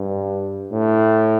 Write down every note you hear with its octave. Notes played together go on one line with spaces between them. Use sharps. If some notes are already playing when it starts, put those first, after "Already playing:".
Already playing: G2
A2